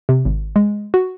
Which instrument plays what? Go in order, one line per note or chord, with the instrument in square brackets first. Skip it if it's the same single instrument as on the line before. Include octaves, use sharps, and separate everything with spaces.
[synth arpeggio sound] C3
G#1
G#3
F#4